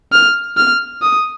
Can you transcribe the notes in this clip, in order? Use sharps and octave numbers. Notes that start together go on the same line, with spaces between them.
F6
F6
D#6